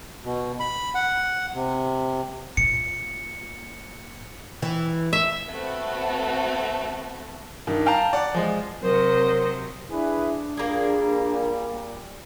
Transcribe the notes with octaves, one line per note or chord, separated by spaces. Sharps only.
B2
B5
F#5
C3
A#2 C#7
E3
E5
A3 B3 C4 F#4 A4
G2 D#3
F5 G5 A5 A#5
D5 F#5
F3 G#3
C3 F#3 A#4 C5 D#5
D4 E4 G#4 B4
A#2 G3 A#3 G#4